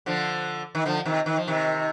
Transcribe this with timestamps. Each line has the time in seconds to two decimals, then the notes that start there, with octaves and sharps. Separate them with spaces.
0.06 D3 F3
0.75 D#3
0.86 D3 F3
1.05 C3 D#3
1.26 D#3
1.37 F3
1.48 C3 D#3